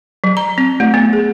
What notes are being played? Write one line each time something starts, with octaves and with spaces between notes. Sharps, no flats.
F#3
A#5
C4
A3
B3
G#4